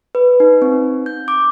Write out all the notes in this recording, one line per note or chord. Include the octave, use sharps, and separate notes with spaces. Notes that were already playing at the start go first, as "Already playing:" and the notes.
B4
D#4
C4
G6
D6